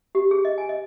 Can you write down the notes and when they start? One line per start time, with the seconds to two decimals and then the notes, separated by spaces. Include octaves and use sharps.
0.15 G4
0.31 G#4
0.45 D#5
0.58 G#5
0.69 D#5